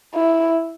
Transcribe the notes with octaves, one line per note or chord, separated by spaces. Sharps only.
E4